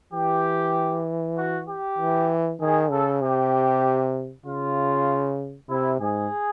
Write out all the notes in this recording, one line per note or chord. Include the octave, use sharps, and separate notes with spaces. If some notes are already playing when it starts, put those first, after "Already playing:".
E3 G4
F#4
G4
E3
D#3 G#4
C#3 A4
C3 G4
C#3 F4
C3 E4
G#2 G#4